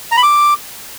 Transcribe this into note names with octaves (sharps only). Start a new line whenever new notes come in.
A#5
B5
D6